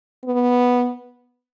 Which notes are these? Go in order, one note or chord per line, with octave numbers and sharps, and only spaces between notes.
B3